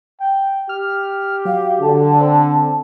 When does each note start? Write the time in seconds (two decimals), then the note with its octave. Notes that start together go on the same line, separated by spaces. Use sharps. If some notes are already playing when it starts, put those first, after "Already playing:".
0.21 G5
0.69 G4 F6
1.45 F#3 F5
1.81 D3 A5
2.20 C4